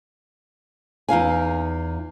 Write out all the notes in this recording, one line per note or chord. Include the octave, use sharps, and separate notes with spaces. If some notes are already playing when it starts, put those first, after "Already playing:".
E2 D#4 F5 G#5